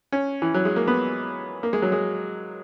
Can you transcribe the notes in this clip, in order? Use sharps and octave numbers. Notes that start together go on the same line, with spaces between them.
C#4
E3
F#3
G#3
A#3
B3
A#3
G#3
F#3
G#3